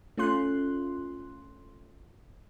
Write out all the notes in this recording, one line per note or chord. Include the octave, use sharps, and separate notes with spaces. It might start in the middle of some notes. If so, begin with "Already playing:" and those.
A3 C#4 F4 C6 F#6